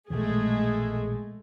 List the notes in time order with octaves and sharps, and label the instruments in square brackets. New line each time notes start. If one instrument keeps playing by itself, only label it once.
[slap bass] A#1 B2 E3 [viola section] G#3 A3 G#4